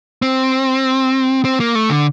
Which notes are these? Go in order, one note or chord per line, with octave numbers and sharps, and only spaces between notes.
C4
C4
A#3
A3
D3